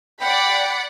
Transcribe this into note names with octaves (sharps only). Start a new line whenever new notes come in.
D5 F#5 G5 B5